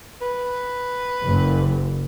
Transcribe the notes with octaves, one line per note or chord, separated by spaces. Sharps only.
B4
F#1